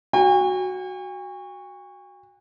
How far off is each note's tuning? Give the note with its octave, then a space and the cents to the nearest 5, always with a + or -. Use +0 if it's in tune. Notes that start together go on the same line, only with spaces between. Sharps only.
F#4 +0 G#5 -45